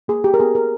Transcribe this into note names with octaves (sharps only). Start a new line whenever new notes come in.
A#3 G#4
G4
A#4
B3 G#4
G4 A#4